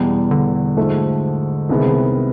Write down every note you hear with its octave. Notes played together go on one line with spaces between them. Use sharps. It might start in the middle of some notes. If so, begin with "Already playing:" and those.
Already playing: E2 B2 G3
D3
G#2 F3 A3
C2 C3 D#3 G#3 B3